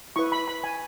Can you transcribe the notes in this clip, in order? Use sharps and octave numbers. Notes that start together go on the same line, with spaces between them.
E4 B4 C#6
B5
B5
G#5